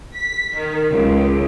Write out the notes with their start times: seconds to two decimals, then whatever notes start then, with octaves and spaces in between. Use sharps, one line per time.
0.17 B6
0.55 D#3
0.92 C#2